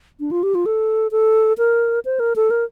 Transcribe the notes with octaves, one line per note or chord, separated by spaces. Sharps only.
D4
F4
G4
F4
A4
A4
A#4
C5
A#4
A4
A#4